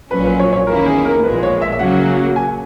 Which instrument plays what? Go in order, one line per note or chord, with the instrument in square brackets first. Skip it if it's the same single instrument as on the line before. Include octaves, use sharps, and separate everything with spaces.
[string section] A#1 A#2 F#3 C#4 [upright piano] B4
[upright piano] B4
C#5
C#5
[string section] E2 D#3 A#3 C#4 E4 [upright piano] A#4
[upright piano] G#4
A#4
[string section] A#1 A#2 G#3 [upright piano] B4
[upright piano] C#5
E5
E5
[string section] C#3 F#3 A#3 [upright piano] F#5
[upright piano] G#5